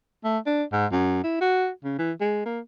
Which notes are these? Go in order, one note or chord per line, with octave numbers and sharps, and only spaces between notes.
A3
D4
G#2
F#2
E4
F#4
C#3
E3
G#3
A#3